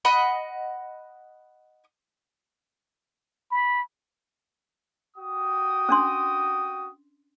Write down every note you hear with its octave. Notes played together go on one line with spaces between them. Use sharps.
D#5 F#5 B5
B5
F#4 G5 D#6
C#4 D4 C6